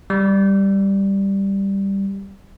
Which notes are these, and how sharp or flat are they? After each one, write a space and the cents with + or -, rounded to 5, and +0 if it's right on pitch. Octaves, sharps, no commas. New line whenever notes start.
G3 +5